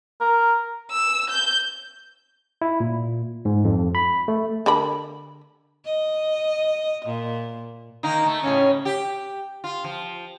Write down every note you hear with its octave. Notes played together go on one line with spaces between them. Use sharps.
A#4
E6
G6
E4
A#2
G#2
F2
B5
A3
D3 A#4 B5
D#5
A#2
D#3 A#3 D#4
A3
A2 C#3 C#4
G4
F4
F3